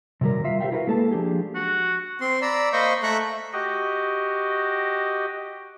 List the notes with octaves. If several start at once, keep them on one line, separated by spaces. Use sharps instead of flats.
C3 D#3 F#3 G3 A#4
G3 F4 E5 F5
G4 C5 D5 E5 F5 G5
E4 F#4 A#4 B4 E5 F5
G#3 A#3 A4 B4 A5
F3 D4 G4 G#4
F#4
C4 C6
D5 A#5 B5 E6
A#3 C5 D#5 B5 C#6
A3 A4 E5 A#5 C#6 F#6
F#4 G4 D#5